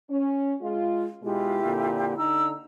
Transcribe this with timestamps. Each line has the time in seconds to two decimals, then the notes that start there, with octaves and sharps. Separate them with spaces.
0.10 C#4
0.61 G#3 F4
1.22 B2 G#3 E4 F4 G4
1.63 F2 A#2 D3
2.17 D3 D#4 A#5 E6